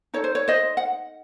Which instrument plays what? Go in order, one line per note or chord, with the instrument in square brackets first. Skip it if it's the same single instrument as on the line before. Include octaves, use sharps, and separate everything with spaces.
[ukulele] D#4 A4 C#5
C5
C#5
C5 D#5
F#5